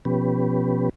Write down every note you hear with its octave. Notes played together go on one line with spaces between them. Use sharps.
B2 F3 B3 C#4 G4 B4